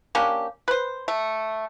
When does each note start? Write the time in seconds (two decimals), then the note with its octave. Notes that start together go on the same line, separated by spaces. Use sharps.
0.15 A#3 C#4 D4 G4
0.68 B4 C5
1.08 A3